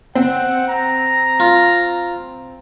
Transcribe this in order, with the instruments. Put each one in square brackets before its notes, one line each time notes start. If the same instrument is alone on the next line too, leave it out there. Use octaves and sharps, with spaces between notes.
[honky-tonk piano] C4 [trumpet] F#5
[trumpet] A#5
[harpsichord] F4